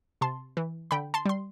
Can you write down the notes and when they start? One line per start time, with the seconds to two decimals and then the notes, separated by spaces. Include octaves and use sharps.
0.21 C3 A5 C6
0.57 E3
0.91 D3 G5 B5
1.14 A5 C6
1.25 G3 C6